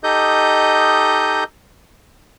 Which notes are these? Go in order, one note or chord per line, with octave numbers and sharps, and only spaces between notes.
D#4 G4 A4 D#5 D#6 G6